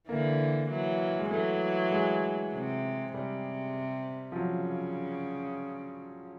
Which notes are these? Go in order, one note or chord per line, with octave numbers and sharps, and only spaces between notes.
D3 E3 A#3
E3 F#3
G#3
E3 F#3 A3
G#3
C3
C3 G3
F3
C#3 F#3